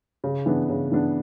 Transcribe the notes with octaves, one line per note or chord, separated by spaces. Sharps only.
C#3
E3 B3 D4
C#3
E3 B3 D4